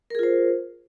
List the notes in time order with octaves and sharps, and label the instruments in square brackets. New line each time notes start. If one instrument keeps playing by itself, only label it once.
[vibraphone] A#4
G#4
F4
C5